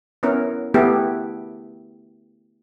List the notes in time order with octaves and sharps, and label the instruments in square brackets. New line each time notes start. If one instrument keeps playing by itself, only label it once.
[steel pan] B3 C#4 E4 A#4
A3 B3 E4 G4 G#4